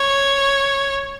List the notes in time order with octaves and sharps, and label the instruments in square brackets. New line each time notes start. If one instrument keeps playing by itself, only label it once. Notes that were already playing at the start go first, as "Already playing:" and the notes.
Already playing: [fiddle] C#5